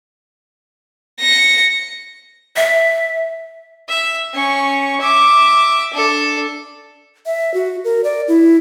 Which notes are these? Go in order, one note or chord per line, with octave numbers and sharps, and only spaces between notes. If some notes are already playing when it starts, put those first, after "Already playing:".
A#6 C#7
E5
E5
C#4 C#6
E5 D6
D4 A4
E5
F#4
A#4
D5
E4